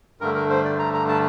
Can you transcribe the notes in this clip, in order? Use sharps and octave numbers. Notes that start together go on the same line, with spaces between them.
G2 D3 A3 A#4
A#4
C5
D5
A#5
A#5
A5